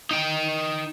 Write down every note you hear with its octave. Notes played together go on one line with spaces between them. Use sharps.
D#4 G5